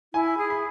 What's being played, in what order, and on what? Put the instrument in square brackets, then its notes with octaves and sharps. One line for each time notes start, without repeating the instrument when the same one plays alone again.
[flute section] E4 [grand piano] G#5
[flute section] G#4
[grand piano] B5